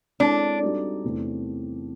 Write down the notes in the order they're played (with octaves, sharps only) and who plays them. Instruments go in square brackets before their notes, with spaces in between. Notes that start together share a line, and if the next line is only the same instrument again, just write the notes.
[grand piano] G#3 C4 E4 A4 C#5 [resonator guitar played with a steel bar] D4
[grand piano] G3 C4 D#4 F#4 A4
E2 C3 E3 A3 C4